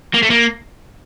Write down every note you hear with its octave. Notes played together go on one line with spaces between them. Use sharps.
A#3
A3
A#3